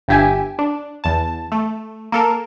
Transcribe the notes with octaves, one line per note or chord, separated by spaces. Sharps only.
G1 G2 G4 E5 G#5
D4
E2 A5
A3
A#3 A4 A#4